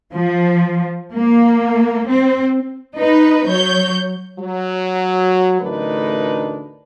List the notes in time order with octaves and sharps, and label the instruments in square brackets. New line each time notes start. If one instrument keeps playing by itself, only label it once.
[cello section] F3
A#3
C4
[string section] D#4 B4
F#3 C#5 G6
[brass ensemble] F#3
A1 D2 D4 D#4 A#4 B4